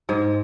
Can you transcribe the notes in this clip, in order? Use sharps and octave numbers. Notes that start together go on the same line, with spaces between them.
G#2 G#3